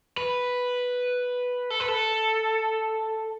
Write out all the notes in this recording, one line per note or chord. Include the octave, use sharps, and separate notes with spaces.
B4
A4
B4
A4